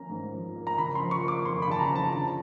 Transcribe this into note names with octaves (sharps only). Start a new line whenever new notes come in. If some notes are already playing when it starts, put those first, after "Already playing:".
Already playing: F3 A#3 C#4 A#5
G#2
F3
A#3
A#5
C#3 B5
F3 C6
C#6
A#3 D6
F2 C6
B5
C#3 A5
A#5
F3
A5
D3 A5